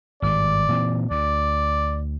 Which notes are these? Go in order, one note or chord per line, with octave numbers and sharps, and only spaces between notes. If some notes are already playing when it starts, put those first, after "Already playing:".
G#1 G2 D5
A#2 E3 C4
D2 D5